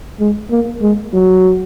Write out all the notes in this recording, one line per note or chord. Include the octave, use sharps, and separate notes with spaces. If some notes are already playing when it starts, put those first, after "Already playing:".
G#3
A#3
G#3
F#3